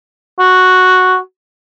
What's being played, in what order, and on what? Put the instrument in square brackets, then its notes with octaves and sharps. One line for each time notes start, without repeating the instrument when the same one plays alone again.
[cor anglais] F#4